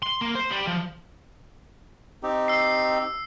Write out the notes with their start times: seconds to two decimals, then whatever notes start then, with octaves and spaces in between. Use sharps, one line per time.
0.03 C6
0.21 A#3
0.35 C5
0.51 G3
0.67 F3
2.23 C4 D#4 G4
2.48 E6 C7